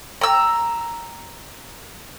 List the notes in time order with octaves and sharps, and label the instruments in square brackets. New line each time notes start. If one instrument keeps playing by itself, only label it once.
[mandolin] A#5 E6